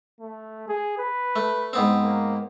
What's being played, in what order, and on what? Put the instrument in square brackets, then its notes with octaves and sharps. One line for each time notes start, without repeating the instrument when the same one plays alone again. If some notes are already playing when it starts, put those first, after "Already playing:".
[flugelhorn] A3
G#4
B4
[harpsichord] A3
G#2 B3 C4
[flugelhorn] A#3